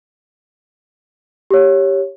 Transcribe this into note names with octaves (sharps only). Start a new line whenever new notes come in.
G4 C#5